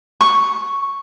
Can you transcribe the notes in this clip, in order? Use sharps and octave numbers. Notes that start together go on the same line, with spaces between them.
C#6